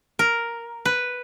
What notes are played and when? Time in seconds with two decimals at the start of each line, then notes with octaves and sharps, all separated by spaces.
0.19 A#4
0.86 B4